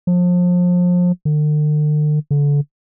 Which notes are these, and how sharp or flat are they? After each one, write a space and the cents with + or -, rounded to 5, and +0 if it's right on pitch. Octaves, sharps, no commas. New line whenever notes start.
F3 +30
D3 +45
D3 -30